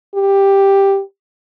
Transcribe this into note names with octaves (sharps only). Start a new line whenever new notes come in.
G4